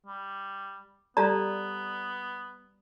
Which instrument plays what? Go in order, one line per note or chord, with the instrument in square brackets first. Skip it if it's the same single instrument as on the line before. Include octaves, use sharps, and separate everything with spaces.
[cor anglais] G3
[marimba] G3 G4 A4 [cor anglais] B3 [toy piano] D5 A5 A#5